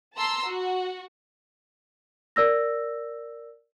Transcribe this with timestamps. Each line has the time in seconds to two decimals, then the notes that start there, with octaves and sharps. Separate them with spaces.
0.15 A5 A#5 C6 E6
0.46 F#4
2.36 A#4 D5 E6 A#6